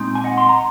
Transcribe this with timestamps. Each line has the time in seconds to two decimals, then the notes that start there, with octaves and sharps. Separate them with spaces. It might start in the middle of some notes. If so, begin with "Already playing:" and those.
Already playing: A#2 G#3 C4 D#4
0.15 G#5
0.24 D#5 F#5
0.38 C6
0.49 A#5